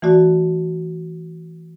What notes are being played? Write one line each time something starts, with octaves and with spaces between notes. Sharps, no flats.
E3 A3 F#4 D5